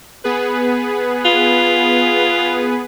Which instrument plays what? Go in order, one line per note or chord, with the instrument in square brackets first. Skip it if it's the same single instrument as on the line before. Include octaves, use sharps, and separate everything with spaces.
[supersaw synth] B3 G#4 B4
[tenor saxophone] F4